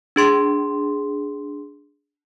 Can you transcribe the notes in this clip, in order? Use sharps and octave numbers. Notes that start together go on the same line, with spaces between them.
D4 G#4 C6